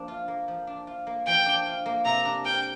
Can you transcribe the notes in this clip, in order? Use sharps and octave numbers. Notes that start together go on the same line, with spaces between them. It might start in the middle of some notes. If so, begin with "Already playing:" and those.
Already playing: F3 A#3 D4
F4
A#3
F3
D4
F4
A#3
F3 G5
D4
F4
A#3
C3 A#5
D4
A#4 G5